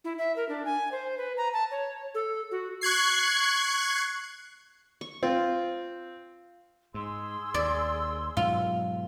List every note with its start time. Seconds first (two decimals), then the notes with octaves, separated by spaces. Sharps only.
0.04 E4
0.18 E5
0.36 A#4
0.49 D4
0.65 G#5
0.92 C5
1.17 B4
1.37 A#5
1.53 A5
1.71 C#5
2.14 A4
2.51 F#4
2.81 C#6 F#6 G#6 C7
5.01 C#6
5.23 C4 F4
6.94 G#2 G#4 C6 E6
7.54 D#2 D5
8.37 G#2 B2 F#3 F4